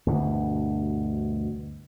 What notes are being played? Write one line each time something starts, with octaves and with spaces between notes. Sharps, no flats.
D2 G2 B2